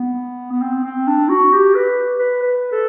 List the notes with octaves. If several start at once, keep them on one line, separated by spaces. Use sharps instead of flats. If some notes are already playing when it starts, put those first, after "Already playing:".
Already playing: B3
B3
C4
C4
D4
F#4
G4
B4
B4
B4
A4